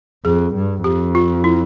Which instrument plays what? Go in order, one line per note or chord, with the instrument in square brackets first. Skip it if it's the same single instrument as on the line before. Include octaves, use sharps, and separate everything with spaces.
[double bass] F2 [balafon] G#4
[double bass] G2
[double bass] F2 [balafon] G4
[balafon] F4
E4